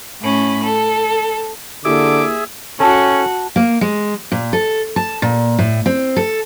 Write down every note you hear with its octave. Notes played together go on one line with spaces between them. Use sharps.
A2 C#4 B5
A4
D3 A#3 E4 G4 G#4 E5 D6
C#4 F#4 A4 A5
A#3
G#3
A#2
A4
A5
A#2
A2
C4
A4